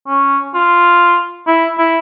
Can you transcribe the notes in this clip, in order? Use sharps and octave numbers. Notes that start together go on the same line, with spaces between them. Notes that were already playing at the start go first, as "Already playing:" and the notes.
C#4
F4
E4
E4